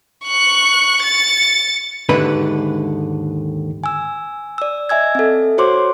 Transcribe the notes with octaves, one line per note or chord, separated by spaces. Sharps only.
C#6 F#6
A6 C#7
D#2 G#2 D3 D4 E4 B4
G#5 E6
D5 E6
D#5 E5 G#5 E6 G#6
C4 A4
F#4 C5 C#5 C6 D6